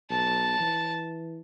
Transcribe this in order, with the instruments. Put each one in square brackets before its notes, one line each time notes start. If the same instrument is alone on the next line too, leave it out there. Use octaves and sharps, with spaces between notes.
[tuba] B1 [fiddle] A5
[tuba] E3